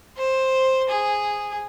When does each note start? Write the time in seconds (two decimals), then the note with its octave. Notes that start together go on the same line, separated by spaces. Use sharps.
0.17 C5
0.89 G#4